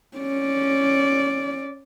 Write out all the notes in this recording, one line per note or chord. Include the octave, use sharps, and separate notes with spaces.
C#4 D5